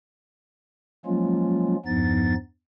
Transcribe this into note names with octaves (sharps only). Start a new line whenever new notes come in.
F3 F#3 G#3 A#3 C#4 F4
E2 G2 F3 B3 D#4 A6